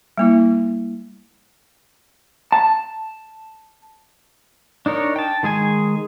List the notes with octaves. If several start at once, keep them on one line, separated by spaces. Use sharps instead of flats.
G3 A#3 E4
A5
D4 D#4 A#4 C#5
G5 A5
D#3 G#3 G#4 G#5